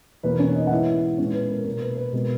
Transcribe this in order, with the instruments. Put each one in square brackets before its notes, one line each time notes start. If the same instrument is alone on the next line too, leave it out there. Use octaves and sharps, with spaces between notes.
[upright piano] E2 B2 A#3 B4
C#4 C#5
D#4 D#5
F#5
G#2 E3 G#3 B3 E4 E5
A#2 G#3 B3 C#4 C#5
B4
A#4
B2 A#3 A#4
B4
B4
B2 G#3 B3 A#4